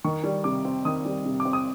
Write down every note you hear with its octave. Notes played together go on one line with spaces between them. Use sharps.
D#3 C#6
G3
C3 D6
C4
D#3 D#6
G3
C3
D6
C4
D#6